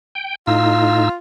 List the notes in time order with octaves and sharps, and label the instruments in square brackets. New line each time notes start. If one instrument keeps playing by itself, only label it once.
[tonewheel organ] G5
[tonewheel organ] A2 D#4 E6 [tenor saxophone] F4